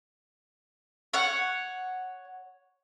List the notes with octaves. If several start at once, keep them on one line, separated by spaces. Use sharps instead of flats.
C#5 F#5